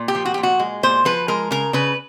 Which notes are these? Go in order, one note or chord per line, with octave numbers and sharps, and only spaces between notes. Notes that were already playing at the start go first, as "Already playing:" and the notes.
Already playing: A#2
G4
F3
F#4
G4
A#2
F#4
G#3
A#2 C5
F3 B4
G#3 A#4
C#3 A#4
C#3 B4